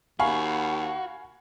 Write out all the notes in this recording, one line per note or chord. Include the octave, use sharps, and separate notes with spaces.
D#2 F#4 F5 G#5 B5 C#6